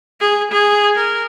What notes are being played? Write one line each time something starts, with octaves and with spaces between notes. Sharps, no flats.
G#4
G#4
A#4